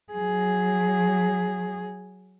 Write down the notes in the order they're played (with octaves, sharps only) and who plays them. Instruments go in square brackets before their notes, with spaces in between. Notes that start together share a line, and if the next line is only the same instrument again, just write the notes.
[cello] F#3 G#4